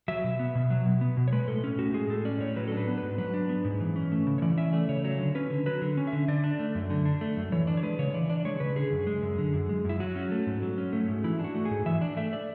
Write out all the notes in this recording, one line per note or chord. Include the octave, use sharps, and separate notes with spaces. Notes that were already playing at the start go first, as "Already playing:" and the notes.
F#3 E5
B2
B3
B2
F#3
B2
B3
B2
C#5
G#3 B4
A2 A4
C#4
A2 F#4
G#3 G#4
A2 A4
C#4 D5
A2 C#5
F#3 B4
A4
D4
B4
B3
B4
G#2
F#3 B4
D4
B3
G#2
E3
C#4
A3
C#3
C#5
E3 D5
C#4 E5
A3 D5
C#3 C#5
F#3 C#5
D3
C#4 B4
D3
F#3 B4
D3
C#4
E5
D3
D3 D5
D4
A3
F#2
D3
D4
A3
F#2
E3 C#5
D4 D5
C#5
G#3 B4
C#3 C#5
E3 D5
D4 D5
D5
G#3 C#5
C#3 B4
D3 G#4
F#2
G#3
F#2
D3
F#2
G#3
F#2 E4
F#3 F#4
C#4
A3
G#2
F#3
C#4
A3
G#2
E3 E4
D4
F#4
A3
G#4
G#2
E3 E5
D4 D5
A3 E5
D5